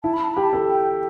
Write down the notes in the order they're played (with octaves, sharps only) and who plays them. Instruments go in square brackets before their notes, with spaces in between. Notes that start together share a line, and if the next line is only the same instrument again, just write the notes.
[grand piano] E4 [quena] A5
[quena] B5
A5
[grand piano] G4 [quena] B5
[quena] A5
[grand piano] A4
[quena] G5